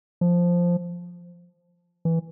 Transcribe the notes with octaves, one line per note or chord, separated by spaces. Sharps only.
F3
E3